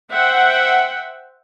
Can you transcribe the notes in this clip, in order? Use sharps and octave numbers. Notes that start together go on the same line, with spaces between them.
C5 E5 F#5 G5